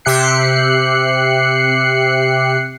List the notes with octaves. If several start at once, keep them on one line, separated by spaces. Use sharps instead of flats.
C3 G4 E5 F#6 C7 C#7